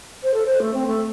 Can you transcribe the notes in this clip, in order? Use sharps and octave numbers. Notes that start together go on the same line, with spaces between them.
C5
A4
C5
A3
C4
A3